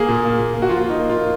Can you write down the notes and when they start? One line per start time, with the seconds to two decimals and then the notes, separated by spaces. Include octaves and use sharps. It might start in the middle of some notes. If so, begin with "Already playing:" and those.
Already playing: A#3 G#4
0.08 A#2
0.24 A#3
0.39 A#2
0.54 A#3
0.62 F#4
0.69 F3 F4
0.84 A#3
0.90 D#4
1.00 A#3
1.09 F4
1.14 A#3